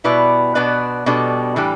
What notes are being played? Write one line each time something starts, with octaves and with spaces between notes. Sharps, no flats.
B2 G3 E4 B4 D5
B2 B3 D4 B4 D5
B2 G3 D4 A4 D5
A2 E3 G3 D4 G4